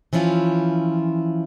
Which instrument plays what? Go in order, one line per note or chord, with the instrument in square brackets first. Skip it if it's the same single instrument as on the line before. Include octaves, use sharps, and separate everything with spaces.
[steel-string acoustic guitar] E3 F3 C#4 E4 F4